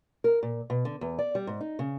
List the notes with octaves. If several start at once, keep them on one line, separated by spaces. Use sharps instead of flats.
A#4
A#2
B2
D3
E2
D5
G3
G#2
D#4
C#3